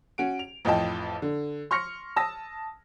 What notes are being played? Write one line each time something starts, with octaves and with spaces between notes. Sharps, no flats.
C#4 F#4 D7
F7
A1 F2 F4 D#5 G5 A5
D3
C6 C#6 F6 A#6 C#7
A5 D#6 E6 A#6